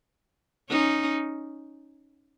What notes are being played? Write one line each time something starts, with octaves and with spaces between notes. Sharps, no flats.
C#4 D#4